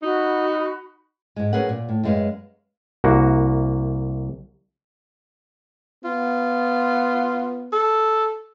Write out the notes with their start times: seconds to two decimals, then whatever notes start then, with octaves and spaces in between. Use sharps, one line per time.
0.02 D#4 F#4 B5
1.36 G#2 G#3
1.53 F#3 C#4 G#4 A#4 B4 F#5
1.69 A#2
1.89 A2
2.03 F#2 G3 G#3 F#4 B4 F5
3.04 C2 A#3 F#4
6.04 B3 F4
7.73 A4